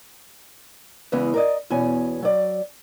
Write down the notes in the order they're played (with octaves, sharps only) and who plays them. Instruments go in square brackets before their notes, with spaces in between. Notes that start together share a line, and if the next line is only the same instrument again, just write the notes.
[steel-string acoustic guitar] E2 C#3 E3 G#3 B3
A#4 D5 D#5
E2 B2 C#4 G#5
F#3 D5